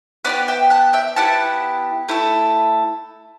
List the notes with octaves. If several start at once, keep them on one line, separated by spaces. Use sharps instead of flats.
B3 E4 G4 B4 D5
E5 G5
F#5 A5
E5 G5
B3 E4 G4 F#5 A5
A3 E4 A4